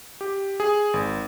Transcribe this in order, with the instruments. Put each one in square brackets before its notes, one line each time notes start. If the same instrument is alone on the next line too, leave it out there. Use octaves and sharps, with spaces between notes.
[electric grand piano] G4
G#4
G#1